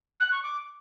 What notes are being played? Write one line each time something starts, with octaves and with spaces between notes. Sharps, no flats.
F#6
C#6
D6